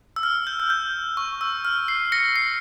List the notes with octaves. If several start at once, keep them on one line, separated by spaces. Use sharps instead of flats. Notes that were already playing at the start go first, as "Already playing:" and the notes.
E6
F6
G6
F6
G6
C#6
E6
F6
C7
A#6 C#7
C7